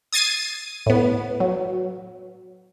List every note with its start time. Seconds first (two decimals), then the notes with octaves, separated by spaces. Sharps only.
0.13 D#6 G#6 A6 C7 D#7
0.86 A2 B3
1.40 F#3